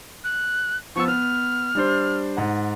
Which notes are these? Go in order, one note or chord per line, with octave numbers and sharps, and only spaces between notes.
F#6
F3 B3 C#6 E6
B3 F6
G3 D4 C5
G#2 F#5